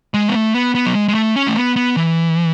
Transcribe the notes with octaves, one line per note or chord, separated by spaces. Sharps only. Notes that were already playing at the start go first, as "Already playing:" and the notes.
G#3
B3
A3
B3
B3
F#3
G#3
G#3
A3
C#4
A3
B3
B3
E3